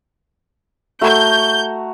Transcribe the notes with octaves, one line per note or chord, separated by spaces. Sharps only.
A3 F#4 A#5 G6